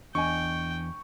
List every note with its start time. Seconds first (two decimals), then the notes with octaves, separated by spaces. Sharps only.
0.15 E2 D4 D#5 G5 G#5 C#6